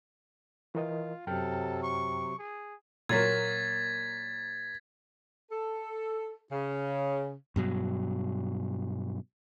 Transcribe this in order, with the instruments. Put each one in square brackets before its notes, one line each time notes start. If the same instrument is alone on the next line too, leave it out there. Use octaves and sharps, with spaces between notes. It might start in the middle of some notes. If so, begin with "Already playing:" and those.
[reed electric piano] E3 A#4 D#5 [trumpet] F4
[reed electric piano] F#2 G5 F6 [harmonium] C3 F#3 [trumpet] A4
[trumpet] C#6
G#4
[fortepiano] A#2 F#3 A#3 [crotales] G#6 A6 B6
[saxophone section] A4
C#3
[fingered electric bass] G2 B2 F#3